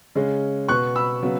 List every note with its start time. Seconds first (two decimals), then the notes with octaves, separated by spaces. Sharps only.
0.15 C#3 G#3 C#4
0.68 B2 B3 C#6 F#6
0.96 B5 E6
1.22 C#3 F#3 B3